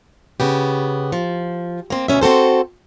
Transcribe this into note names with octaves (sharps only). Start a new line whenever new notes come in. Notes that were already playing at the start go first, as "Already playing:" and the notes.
C#3 B3 G4
F3
A#3 C4
D2 B2 F#3 C#4 E5
C4 F#4 A4 C5